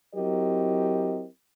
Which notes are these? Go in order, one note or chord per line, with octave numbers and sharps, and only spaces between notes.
F#3 C4 E4 G4 A#4 D#5